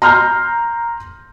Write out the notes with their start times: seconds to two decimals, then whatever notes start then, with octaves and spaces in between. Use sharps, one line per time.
0.02 A#5 C6 F6 G6